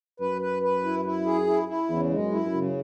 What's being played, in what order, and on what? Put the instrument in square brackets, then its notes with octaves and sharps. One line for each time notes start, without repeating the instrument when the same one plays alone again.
[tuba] F#2 [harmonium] B4
[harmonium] B4
B4
E4
E4
G#4
E4
E4
[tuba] E2 [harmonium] C#3
[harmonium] G#3
[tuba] F#2
[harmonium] E4
[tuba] F#2
[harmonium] C#3